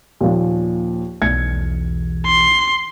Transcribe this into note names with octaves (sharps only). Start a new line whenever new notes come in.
D#2 A#2 F3
B1 E2 G#6 C#7
C6